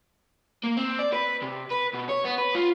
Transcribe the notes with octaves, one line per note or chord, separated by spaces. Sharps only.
A#3
C4
D5
B4
C3
B4
B2
C#5
B3
B4
F4